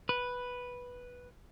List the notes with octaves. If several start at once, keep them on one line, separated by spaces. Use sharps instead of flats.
B4